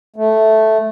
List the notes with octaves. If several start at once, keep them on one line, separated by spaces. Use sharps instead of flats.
A3